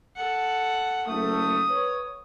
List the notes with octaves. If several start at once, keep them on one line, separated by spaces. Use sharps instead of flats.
A4 F#5
F#1 A3 D#6
B4 C#5